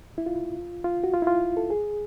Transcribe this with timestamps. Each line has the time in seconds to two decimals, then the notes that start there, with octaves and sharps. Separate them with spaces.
0.18 E4
0.26 F4
0.84 F4
1.04 F#4
1.13 F4
1.22 E4
1.27 F4
1.57 A4
1.70 G#4